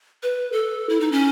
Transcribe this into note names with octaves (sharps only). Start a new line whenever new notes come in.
B4
A4
E4
D#4
C#4